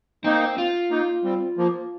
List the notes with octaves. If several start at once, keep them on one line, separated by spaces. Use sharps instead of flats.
A#3 C4 D#4
F4
A#3 D#4
G3 C4
F3 A#3